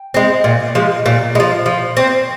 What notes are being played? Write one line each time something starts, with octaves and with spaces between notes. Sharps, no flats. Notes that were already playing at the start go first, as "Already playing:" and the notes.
Already playing: G5
G#3 C4
A#2
F3 G#3
A#2
G#3
F3
F3
C4